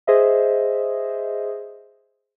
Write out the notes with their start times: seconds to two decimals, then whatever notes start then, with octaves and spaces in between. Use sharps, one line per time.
0.07 G#4 C5 D#5 E5